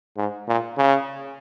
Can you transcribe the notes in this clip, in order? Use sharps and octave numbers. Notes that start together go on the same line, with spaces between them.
G#2
A#2
C#3